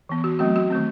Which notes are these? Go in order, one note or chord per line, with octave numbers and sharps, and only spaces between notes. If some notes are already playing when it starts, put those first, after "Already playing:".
E3 B3
F#4
F#3 A3 C4 F#4
F#4
D#3 A3 C4